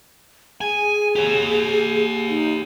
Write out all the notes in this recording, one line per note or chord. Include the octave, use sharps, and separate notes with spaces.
G#4 G#5
G4 C#5
D#4